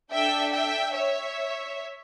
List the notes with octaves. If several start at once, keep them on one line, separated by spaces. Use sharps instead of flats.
D4 A4 E5 G5
E5 G5
C#5 E5